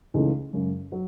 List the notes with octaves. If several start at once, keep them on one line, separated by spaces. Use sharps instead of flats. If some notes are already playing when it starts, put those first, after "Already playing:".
C#2 C#3 E3 A3 D#4
F#2 C#3 G#3
F#3